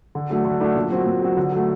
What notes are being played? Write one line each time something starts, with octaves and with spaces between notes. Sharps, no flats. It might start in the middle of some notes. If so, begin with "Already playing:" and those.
D3
F#3 A3 D4
D3
F#3 A3 D4
A#2
F#3 C4 F#4
A#2
F#3 C4 F#4
D3
F#3 A3